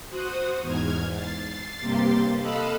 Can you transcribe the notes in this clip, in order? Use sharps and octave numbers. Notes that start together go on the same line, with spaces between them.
F#4 C5 F#5 D#6
E2 G#2 F6 G#6
A6 C7
G2 C3 A#3 G4 C6 A6
A4 D#5 F5 B5 E6 F#6